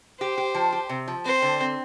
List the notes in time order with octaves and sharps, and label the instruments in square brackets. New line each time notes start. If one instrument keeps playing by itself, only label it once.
[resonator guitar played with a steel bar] G4 [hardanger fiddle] C5
[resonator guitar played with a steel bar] G4
F3
G4
C3
F3
[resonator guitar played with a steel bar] C4 [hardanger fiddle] C5
[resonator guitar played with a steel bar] D3
C4